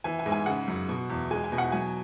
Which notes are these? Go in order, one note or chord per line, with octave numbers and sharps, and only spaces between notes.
E3 G#5
G#5
G#2
G#5
C#3 F#5
F#2
B2
E2
G#3 G#5
G#5
B2
F#5
F#3 G#5